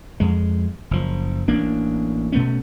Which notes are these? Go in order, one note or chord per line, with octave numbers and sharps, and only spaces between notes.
F2 G#3
F#1 F3
A1 A#3 D4
B2 A3 B3 C#4